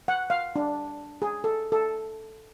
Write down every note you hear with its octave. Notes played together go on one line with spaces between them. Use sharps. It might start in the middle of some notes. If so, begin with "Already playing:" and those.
F#5
F5
D4
G#4
A4
A4